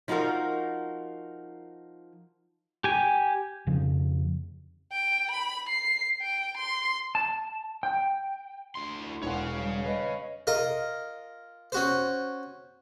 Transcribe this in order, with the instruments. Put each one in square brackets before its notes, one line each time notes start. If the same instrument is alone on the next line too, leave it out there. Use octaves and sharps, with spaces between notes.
[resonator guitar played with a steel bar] F3 D#4 F4 F#4 A#4
[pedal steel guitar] G4 G#5
[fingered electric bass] F2 C#3 F3
[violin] G5
B5
C7
G5
C6
[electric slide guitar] A5
G5
[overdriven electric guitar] D2 C6
[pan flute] E4
[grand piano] E1 F#5 [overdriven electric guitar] C#5 F5
[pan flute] G3
[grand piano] B4 [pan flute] D#5
[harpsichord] F4 A#4 D#5
C#4 F#4 C5